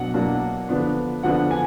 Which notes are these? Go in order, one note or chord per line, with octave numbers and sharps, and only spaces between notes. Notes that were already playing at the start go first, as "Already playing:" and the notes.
Already playing: B2 F#3 D4 F#5
B2 F#3 A#3 D4
D3 F3 B3 D4
D3 F3 B3 D4 F#5
G#5